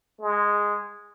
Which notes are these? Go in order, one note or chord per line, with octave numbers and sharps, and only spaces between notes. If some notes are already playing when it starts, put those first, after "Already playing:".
G#3